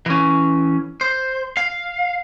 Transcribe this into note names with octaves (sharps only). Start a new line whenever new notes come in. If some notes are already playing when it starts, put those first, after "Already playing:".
E3 C#4
C5
F5